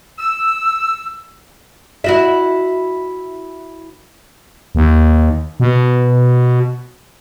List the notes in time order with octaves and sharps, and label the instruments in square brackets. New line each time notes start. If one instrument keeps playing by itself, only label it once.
[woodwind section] E6
[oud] E4 F#4 E5
[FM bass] D#2
B2